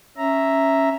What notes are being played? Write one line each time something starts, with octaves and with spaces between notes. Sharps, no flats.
C#4 E5 A#5